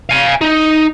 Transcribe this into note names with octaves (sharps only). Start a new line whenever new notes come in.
F5 G#5
D#4